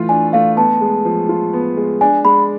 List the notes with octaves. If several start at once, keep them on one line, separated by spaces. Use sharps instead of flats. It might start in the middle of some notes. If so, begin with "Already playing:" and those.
Already playing: E3 A3 F4
D4 G#5
A3 F5
B3 A5
G#3
F3
F4
B3
G#3
D4 G#5
G#3 B5